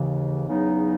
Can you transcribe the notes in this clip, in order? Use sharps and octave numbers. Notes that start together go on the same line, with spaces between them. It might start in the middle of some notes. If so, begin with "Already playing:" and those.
Already playing: D#2 C#3 E3
E2 C#3 F#3 B3 D#4